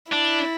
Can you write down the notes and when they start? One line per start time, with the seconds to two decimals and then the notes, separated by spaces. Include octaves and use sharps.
0.12 D4 E4